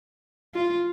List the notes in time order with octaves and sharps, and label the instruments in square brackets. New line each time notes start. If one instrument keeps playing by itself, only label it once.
[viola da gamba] F4